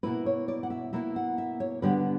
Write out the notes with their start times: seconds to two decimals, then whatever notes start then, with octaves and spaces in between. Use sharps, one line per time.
0.03 B2 A#3 E4 B4
0.26 C#5
0.48 D5
0.63 F#5
0.70 E5
0.93 B2 A#3 E4 E5
1.16 F#5
1.38 E5
1.60 C#5
1.82 D3 G3 B3 D4 B4